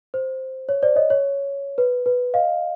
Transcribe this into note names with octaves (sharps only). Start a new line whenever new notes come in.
C5
C#5
C5 D5
C#5 D#5
C#5
B4
B4
D#5 F5